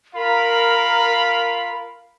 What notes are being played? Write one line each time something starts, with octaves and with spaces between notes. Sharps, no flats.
F4 A#4 F5 B5